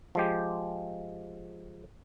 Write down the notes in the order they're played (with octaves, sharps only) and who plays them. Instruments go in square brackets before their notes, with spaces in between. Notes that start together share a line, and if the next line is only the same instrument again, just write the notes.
[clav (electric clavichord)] F3 G#3 G4